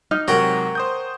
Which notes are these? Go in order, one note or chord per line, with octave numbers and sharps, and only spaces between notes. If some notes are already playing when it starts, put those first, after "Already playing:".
D#4 F6
G#2 C3 F#3 A#4 C#5 F#5 G5
C5 D#6 G6